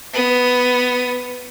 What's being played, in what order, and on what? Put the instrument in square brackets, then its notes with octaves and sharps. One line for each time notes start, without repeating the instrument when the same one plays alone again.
[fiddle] B3 D#6